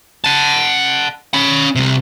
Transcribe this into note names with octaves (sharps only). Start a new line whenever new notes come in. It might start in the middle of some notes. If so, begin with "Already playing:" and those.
F#5 A5
C#4 B5
C2 C3